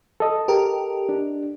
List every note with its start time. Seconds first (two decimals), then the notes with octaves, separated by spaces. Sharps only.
0.20 A4 D#5
0.48 G4 A#4
1.09 D4